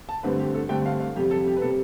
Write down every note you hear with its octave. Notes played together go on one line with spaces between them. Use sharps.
A5
G2 D3 A3 C4 B4
G4
A4
G2 D3 A3 C4 G5
F5
F5
F2 C3 G3 G4
A4
G4
B4
C3 G3 A4